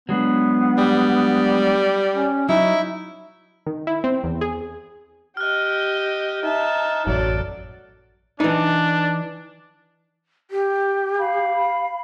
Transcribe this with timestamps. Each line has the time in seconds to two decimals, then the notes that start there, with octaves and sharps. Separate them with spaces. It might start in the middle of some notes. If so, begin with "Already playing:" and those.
0.09 F#3 G#3 B3 D4
0.78 G3
2.15 C#4
2.49 F#3 D#4 E4
3.67 D#3
3.87 E4
4.04 C4
4.24 E2
4.41 G#4
5.37 G4 D#5 F6 F#6
6.43 D#4 E5 A5
7.07 A1 F#2 F#3 A4 D5
8.40 E3 D4 D#4
10.51 G4
11.18 F5 B5